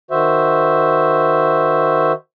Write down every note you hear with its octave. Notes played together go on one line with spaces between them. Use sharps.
D#3 F#4 C5 E5